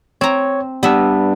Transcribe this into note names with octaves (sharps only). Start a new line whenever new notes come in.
C4 C#5 A#5
G3 B3 D4 E5